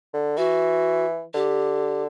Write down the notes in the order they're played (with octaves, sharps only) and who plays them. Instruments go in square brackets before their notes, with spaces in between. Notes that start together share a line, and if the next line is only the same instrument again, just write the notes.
[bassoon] D3
[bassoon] E3 [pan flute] F#4
[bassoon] D3 [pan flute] G4